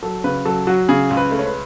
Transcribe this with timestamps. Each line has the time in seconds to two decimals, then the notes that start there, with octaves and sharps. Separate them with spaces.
0.03 F#3 A4
0.24 C#3 B4
0.45 F#3 A4
0.67 F#3 F#4
0.89 C#3 G#4
1.10 C#2
1.17 B4
1.32 A3
1.39 C#5
1.46 B4